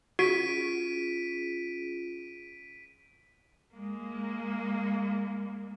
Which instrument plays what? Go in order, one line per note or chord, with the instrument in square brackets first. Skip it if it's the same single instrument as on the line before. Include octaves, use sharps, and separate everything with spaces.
[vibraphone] C#4 F4 G#4 [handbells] F#4 [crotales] B6 D7 D#7
[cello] G#3 A#3